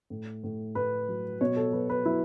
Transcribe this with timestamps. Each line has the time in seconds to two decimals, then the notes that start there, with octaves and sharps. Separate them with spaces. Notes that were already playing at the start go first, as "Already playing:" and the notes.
0.10 A2
0.44 A2
0.75 A2 B4
1.09 F#3
1.41 B2 C#5
1.57 A4
1.73 F#3 B4
1.90 B4
2.05 F#3 E4